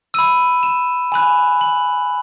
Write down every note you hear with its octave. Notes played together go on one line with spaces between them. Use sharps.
B5 E6 D#7
E7
G#5 B5 F#6
F#7